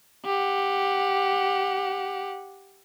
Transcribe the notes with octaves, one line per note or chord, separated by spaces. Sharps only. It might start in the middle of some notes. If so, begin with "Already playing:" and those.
G4 F#5